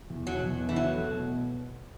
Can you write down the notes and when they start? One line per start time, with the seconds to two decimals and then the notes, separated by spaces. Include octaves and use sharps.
0.10 E2
0.27 B2 F#3
0.43 E2
0.60 B2
0.69 E3
0.76 E2 F#3
0.93 A3
1.10 B2
1.26 B2